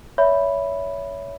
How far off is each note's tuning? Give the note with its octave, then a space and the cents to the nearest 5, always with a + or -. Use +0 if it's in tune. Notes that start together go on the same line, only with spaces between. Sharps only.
C#5 +25 E5 +0 B5 +0